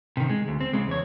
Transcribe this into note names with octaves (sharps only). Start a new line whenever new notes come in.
C3 D#3
G#3
D2
C4
C#3 G#3
E2 C#5